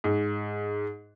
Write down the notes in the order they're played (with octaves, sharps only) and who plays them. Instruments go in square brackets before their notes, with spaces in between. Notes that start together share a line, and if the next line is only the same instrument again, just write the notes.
[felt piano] G#2